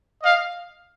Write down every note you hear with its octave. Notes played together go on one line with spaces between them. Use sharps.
D#5 F5